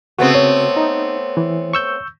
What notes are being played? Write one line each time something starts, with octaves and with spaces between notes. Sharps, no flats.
C#3 A3 B3 C4 F#4
C#5
D#4
E3
C#6 E6 G6